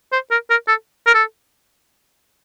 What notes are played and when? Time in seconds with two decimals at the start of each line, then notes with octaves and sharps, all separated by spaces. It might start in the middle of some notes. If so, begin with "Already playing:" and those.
0.12 C5
0.31 A#4
0.50 A#4
0.68 A4
1.07 A#4
1.14 A4